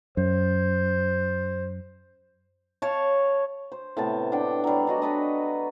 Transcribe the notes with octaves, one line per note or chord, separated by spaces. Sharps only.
F#2 C5
C#5 F5 A5
C5
A2 C3 B3 A5
D4 F#5 G5
F#3 G3
D4 F#4 D#5
A4 B4 D#5